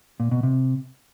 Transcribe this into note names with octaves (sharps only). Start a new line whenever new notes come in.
A#2
B2
C3